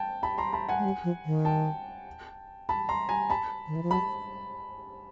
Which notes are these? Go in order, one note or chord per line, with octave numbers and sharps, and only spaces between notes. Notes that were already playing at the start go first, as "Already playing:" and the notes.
Already playing: G5 A5
A5 B5
A#5 C6
A5 B5
F#5 G#5
G#3
G3
F3
D#3
G5 A5
A5 B5
A#5 C6
G#5 A#5
A5 B5
D#3
E3
F3
F#3 A5 B5